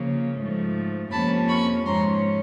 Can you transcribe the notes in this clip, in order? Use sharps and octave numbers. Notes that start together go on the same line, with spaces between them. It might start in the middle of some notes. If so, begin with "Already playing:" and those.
Already playing: C#3 F3 A#3
G#2 F3 A3
F2 C3 F3 A#3 C#4 A5 B5
B5 C#6
G#2 F3 G#3 C#4 A#5 C6